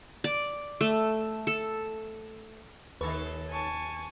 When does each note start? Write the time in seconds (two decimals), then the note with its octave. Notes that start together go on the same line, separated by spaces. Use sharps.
0.24 D5
0.81 A3
1.47 A4
3.01 D#2 D#3 A4 B4 C#5
3.50 G#5 A5 C#6